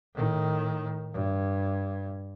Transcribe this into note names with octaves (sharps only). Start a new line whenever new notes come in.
A2 D#3
G2